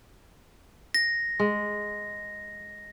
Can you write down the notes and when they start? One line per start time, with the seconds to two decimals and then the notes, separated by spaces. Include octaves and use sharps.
0.94 A#6
1.40 G#3